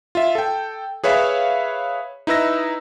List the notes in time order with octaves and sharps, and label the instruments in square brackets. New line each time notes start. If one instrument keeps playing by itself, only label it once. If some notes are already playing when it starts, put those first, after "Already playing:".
[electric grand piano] F4 E5
A4 G5
G#4 B4 C#5 E5 F5 B5
D#4 E4 B4 E6 A#6